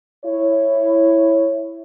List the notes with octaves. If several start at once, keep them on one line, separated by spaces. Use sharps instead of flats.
E4 C#5